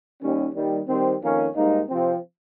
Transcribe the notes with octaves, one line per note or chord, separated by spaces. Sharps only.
D#2 D#3 G3 C#4
D#2 D#3 G3
D#3 G3 C4
F2 D#3 A#3 C#4
G#2 G3 A#3 D#4
C3 F3 C4